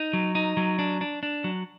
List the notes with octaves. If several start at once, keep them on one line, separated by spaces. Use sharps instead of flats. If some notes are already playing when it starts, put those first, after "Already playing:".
Already playing: D#4
F#3
D#4
F#3
D4
D4
D4
F#3